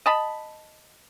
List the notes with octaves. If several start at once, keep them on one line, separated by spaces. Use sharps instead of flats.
D#5 A5 B5